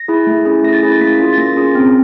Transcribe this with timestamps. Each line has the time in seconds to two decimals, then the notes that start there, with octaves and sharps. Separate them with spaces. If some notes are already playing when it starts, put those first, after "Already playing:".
Already playing: A#6
0.08 E4 G#4
0.27 A3
0.45 C#4 E4 G#4
0.64 A3 A#6
0.73 A6
0.83 C#4 E4 G#4
0.92 A6
1.01 A#3 B6
1.20 C#4 F4 G#4
1.33 A6
1.38 A#3 A#6
1.56 C#4 F4 G#4
1.75 C4